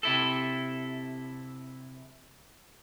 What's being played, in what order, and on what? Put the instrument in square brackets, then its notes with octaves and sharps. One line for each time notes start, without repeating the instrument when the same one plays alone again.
[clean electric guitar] C3 E4 A4